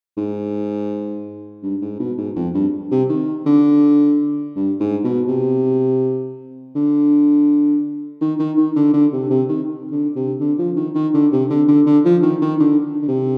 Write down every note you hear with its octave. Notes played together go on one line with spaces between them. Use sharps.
G#2
G2
G#2
B2
G#2
F2
G2
C3
D#3
D3
G2
G#2
B2
C3
D3
D#3
D#3
D#3
D3
D3
C3
C3
D#3
D3
C3
D3
F3
D#3
D#3
D3
C3
D3
D3
D3
F3
D#3
D#3
D3
D3
C3